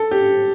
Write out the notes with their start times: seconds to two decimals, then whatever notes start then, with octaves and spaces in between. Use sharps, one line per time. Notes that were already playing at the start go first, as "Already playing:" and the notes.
Already playing: A4
0.11 G4